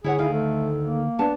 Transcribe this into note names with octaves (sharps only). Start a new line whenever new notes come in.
D3 E4 G#4 C#5 F#5
D2 D#3 E4 F5
A3 A4
A#3
B3 D4 A5